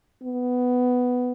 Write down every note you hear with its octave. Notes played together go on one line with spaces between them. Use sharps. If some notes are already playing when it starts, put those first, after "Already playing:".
B3